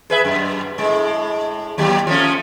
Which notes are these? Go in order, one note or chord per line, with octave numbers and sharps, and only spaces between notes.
G#4 B4 E5
F#2
A2 G#3
D#2 F#3 G4
F3 A3 C#4